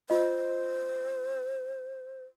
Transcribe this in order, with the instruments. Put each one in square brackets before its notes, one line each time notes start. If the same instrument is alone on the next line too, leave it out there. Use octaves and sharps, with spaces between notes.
[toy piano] F4 D#5 [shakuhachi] C5